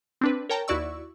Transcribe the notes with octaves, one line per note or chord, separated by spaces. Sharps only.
C4 D4 B4
A#4 C#5 G5 A5 A#5
D#2 E4 F#4 D5 C#6 E6